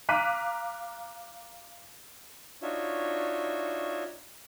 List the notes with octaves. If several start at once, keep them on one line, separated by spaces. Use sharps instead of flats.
F5 A#5 D6 F#6 B6 D#7
D4 D#4 F4 F#4 C#5 E5